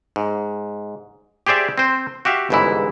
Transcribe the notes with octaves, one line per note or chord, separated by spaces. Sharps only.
G#2
G4 G#4 C5 D5 E5
C4 C5
F#4 G4 E5 F5
G1 C#2 G#2 E3 E4